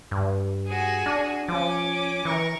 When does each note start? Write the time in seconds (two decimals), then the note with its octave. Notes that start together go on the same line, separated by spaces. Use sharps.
0.11 G2
0.67 F#4 G#4
1.06 D4
1.48 F3 C#4 D6
2.25 E3 A#4 C#6